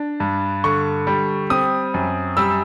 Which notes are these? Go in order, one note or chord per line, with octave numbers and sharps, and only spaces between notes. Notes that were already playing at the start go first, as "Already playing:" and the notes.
Already playing: D4
G2
D3 C#6
G3
C4 D#6
F#2
G3 E6